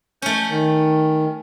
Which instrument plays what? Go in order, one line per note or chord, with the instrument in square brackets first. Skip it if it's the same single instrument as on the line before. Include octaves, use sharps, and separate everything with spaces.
[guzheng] A3 C#4 [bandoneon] G6
[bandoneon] D#3